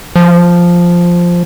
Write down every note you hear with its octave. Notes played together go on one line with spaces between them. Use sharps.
F3